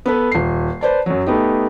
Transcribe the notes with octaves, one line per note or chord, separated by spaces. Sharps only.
B3 A4 B4
D#1 C7
B4 C5 D5 A5
F#2 F#3
A3 B3 D#4 G4